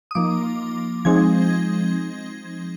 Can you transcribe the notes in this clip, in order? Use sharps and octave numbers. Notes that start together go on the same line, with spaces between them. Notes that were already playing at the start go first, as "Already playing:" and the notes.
D#6
F3 A#3 D#4 D6
F3 G#3 C4 D#4 G#6